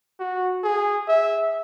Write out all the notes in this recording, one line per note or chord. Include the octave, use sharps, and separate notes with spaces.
F#4
G#4
E5